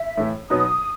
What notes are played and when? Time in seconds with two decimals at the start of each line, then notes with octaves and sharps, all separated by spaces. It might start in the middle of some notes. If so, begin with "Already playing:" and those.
Already playing: E5
0.17 A2 E3 A3
0.50 B2 F#3 B3 D#4 D#6